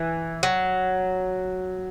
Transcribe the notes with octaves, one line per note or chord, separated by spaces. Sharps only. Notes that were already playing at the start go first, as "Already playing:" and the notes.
Already playing: E3
F#3